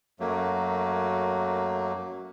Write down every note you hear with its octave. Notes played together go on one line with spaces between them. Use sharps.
F#2 F#3 A3 A#3